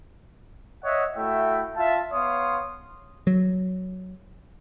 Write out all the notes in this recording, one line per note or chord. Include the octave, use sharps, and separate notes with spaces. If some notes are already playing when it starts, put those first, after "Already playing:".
C#5 D#5 E5 F#5
A3 E4 F#4 E5 G5
F4 E5 F5 A5
B3 C#5 F5 C6 D#6
F#3